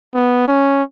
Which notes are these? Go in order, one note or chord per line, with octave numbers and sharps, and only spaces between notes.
B3
C#4